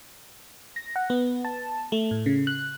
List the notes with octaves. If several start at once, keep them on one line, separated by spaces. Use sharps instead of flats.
A#6
F#5
B3
A5
A3
A2
C#3
F#6